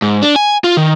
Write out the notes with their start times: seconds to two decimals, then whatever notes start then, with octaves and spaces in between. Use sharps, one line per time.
0.02 G#2
0.23 D4
0.36 G#5
0.64 F4
0.77 D#3